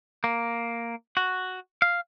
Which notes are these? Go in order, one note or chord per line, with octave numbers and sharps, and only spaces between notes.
A#3
F#4
F5